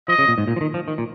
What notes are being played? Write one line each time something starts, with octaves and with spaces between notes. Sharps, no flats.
F3 D#5
C#3
A#2
G#2
A#2
F3
D#3
F3
D#3
A#2